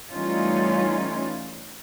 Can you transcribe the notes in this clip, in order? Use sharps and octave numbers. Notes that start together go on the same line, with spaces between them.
E3 G3 A3 C#4 D#4 F4